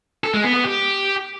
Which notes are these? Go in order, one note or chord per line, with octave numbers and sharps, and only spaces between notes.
A4
G#3
B3
B3
G4